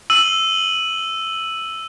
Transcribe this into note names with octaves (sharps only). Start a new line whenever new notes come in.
E6 D#7 F#7